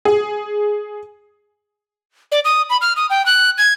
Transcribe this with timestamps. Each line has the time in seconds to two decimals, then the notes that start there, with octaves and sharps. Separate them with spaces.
0.05 G#4
2.32 D5
2.45 D#6
2.70 B5
2.81 F6
2.96 D#6
3.10 G5
3.26 F#6
3.58 G#6